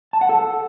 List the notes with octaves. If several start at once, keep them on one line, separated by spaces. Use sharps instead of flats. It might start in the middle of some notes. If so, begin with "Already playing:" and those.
A5
F#5
A4